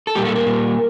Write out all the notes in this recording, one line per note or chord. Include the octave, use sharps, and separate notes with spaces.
A4
A#2 G3 A#3 G4
A4
A#4
A#2 G3 A#3